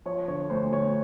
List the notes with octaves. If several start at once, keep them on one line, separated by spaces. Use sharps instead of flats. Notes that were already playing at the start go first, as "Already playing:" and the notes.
F3 C#5
D3 C#5
D2 C5
D2 C#5